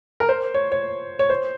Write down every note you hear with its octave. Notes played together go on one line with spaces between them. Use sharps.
A#4
C5
C#5
C#5
C#5
C5